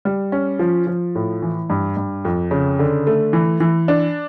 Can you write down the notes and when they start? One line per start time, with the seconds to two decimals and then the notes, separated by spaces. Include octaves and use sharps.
0.05 G3
0.32 C#4
0.59 F3
0.87 F3
1.15 A2
1.42 E3
1.70 G2
1.97 G2
2.25 F2
2.51 C#3
2.79 D3
3.07 A3
3.33 E3
3.60 E3
3.88 D4